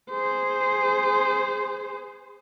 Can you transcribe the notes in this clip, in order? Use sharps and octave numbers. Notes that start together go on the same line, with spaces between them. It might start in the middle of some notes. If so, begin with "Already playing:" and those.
G#4 C5